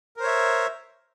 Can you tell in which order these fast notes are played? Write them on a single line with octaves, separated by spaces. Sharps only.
A#4 C5 C#5 E5